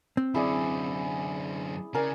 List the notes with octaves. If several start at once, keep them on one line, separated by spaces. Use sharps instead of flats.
C4
F#2 D3 E4 G#4 D5
C#3 A#4 D5 G#5